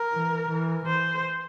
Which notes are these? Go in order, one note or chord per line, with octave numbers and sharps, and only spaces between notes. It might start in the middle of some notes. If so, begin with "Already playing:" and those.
Already playing: A#4
E3
E3
E3 C5